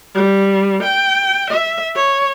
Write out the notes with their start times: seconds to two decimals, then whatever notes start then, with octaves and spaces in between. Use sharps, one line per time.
0.15 G3
0.83 G5
1.50 E5
1.96 C#5